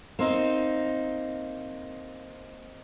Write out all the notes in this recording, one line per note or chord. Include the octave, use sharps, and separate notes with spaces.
A#3 C4 D#4